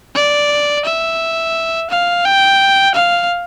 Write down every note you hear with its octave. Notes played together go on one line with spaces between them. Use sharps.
D5
E5
F5
G5
F5